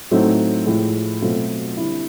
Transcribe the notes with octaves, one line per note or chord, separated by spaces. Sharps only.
A2 F#3 A3 C4 D#4
A2 F3 G#3
B2 F#3 A3 C4 F4
D3 G3 C4 E4